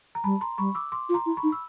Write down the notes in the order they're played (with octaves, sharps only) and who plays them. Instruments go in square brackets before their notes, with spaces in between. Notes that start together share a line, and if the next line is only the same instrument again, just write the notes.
[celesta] A#5
[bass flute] G3 [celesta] A5 B5
[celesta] A#5 C6
[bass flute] G3 [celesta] B5 C#6
[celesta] D6 E6
C6 D6
[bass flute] F4
[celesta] A#5 C6
[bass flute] E4
[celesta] B5 C#6
[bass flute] D#4
[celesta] E6